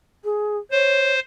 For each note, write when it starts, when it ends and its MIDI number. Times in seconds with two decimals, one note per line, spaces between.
0.24 0.57 68
0.71 1.20 72
0.71 1.13 73